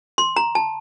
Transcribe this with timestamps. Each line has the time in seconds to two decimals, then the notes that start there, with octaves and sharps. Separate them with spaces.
0.18 C6
0.36 A#5
0.55 A5